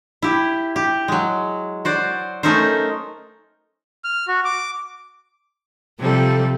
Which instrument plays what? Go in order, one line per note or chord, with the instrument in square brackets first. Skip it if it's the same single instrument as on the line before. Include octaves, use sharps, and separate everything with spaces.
[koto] E4 G4
G4
F#3 G#3
F#4 C5 D5
A3 C#4 D#4 A#4 C5
[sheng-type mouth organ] F6
F#4
D6
[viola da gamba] C3 F3 [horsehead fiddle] G3 A4